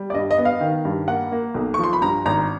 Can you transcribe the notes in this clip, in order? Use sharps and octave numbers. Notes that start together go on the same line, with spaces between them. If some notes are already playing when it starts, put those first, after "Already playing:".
Already playing: G3
D5
G2 D#5
D#5
B3
F5
D#3
G2
A#3 F#5
A#3
B1
C#6
F3
C6
B5
G2 A#5
G#1 A#5